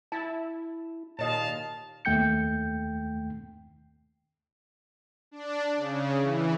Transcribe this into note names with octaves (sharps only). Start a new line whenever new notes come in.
E4 A5
D#2 A#2 C#5 D#5 F5 A5
D#2 A3 G5 G6 C#7
D4
C#3
E3